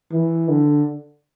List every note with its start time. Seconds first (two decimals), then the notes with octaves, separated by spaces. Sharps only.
0.12 E3
0.49 D3